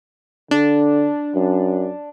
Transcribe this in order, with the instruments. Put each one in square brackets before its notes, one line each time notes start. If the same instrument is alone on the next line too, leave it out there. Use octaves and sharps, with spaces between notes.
[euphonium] D3 [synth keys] D4
[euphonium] F#2